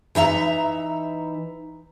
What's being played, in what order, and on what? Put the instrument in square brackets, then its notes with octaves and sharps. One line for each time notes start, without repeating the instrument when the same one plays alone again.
[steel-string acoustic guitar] E3 D#4 E5 A#5